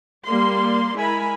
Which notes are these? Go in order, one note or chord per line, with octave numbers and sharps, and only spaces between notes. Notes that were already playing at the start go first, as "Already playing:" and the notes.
G3 A#3 D5 C6
G#3 E4 A#4 G#5 B5